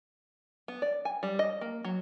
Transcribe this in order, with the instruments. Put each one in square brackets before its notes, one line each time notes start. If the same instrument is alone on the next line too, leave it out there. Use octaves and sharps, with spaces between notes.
[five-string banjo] B3
D5
G#5
G3
D#5
A#3
F#3